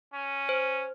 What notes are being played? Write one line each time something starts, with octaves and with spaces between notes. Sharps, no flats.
C#4
C5